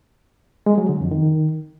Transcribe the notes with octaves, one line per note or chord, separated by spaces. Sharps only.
G#3
F#3
D3
F2
D#3